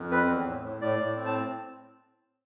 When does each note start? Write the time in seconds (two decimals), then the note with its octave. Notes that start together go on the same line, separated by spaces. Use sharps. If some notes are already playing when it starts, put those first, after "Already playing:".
Already playing: F2
0.11 C4 B4
0.28 E2
0.46 A2
0.63 A2
0.81 A2 D5
0.99 A2
1.16 C4
1.26 A5